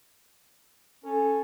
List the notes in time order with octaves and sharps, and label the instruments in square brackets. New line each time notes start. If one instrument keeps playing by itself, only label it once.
[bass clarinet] C#4 [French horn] A4